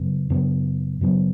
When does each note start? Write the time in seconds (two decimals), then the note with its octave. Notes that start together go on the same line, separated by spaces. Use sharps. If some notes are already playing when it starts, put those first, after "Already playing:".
Already playing: F#2 C#3 F#3 B3
0.30 F#2 C#3 F#3 B3
1.01 F#2 C#3 F#3 B3